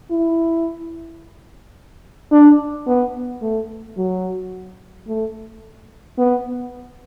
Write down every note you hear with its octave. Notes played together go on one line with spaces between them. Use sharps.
E4
D4
B3
A3
F#3
A3
B3